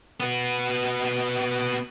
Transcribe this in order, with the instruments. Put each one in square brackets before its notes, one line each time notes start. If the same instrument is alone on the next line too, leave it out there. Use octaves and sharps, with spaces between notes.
[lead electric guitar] B3 F#4